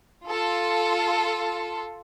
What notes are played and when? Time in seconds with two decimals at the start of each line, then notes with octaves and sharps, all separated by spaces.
0.24 F4 A4